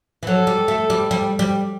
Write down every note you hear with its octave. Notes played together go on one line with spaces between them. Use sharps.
E3
F#3 A4
G3
A3
G3
G3
G3